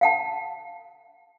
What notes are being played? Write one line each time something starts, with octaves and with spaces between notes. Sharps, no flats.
F5 F#5 A5